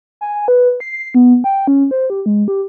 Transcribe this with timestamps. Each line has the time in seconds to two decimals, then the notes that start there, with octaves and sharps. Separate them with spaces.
0.21 G#5
0.48 B4
0.80 C7
1.14 B3
1.44 G5
1.67 C#4
1.91 C5
2.10 G4
2.26 G#3
2.48 G4